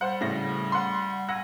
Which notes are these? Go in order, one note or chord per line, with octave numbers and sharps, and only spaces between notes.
G3 C5 F#5
A2 C#3 A#6
F#5 C6
F#5 G#5 E6 A#6